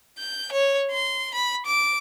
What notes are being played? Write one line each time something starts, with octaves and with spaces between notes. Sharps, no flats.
G6
C#5
C6
B5
D6